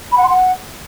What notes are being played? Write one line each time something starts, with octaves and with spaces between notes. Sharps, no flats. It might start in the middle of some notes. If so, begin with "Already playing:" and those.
B5
F#5
C6
F#5